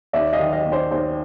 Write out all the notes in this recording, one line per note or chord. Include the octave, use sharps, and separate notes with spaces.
D#2 D5 E5
D#5 F5
D#3
D#5 F5
D#2
C5 D5
D#2 C5 D5